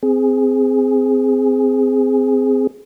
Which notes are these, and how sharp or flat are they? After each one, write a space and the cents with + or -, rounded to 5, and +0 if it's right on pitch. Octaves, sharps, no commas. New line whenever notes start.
C4 -15 G#4 +0